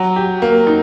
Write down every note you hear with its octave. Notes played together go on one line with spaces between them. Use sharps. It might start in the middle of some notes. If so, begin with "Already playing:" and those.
Already playing: F#3
G4
A#3
D#4